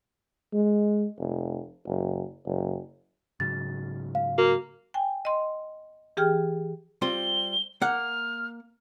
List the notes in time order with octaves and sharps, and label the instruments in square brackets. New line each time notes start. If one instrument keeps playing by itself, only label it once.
[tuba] G#3
F1
F#1
F#1
[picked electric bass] G#2 C#3 F#3 [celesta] A6
[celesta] F5
[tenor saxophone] A#3 [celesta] F#4
[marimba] G5 G#5
D#5 C6
E3 G4 G#4 G5 F6
[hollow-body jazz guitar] G3 C4 F4 [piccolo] G7
[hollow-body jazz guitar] A#3 F#5 [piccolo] F6